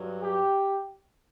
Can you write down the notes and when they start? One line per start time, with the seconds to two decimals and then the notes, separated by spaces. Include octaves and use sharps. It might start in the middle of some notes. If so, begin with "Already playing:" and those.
Already playing: G2 F#3
0.21 G4